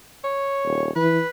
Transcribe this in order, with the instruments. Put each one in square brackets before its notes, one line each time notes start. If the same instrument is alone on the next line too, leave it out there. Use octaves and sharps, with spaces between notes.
[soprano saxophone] C#5
[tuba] D#1
[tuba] E3 [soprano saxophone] B4